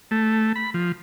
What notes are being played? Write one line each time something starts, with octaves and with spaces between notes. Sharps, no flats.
A3
B5
F3